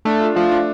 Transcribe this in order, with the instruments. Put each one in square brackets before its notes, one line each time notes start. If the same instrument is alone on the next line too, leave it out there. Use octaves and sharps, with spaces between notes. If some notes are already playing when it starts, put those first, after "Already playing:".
[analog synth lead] A3 [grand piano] D4
[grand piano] F4
[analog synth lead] F3 [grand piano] A3
[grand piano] D4